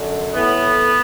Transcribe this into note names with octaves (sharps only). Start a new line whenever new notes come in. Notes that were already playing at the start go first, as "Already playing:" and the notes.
Already playing: F#2 D3
A2 E3 B3